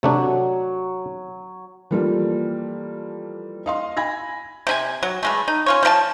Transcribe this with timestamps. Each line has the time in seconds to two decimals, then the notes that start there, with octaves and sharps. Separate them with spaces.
0.03 C3 F#3 A3 D4
1.91 E3 F3 G3 A3 A#3 F4
3.66 D#5 F5 C6
3.97 G#5 B5 G#6 A#6
4.67 C3 D#4 G#5
5.03 F#3
5.23 E3 G#3 A3
5.48 D#4
5.66 C#4 F4 C#5
5.83 F3 A#4 A5